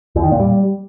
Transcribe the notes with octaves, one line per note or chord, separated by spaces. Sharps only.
E2
D#3
A#2
G3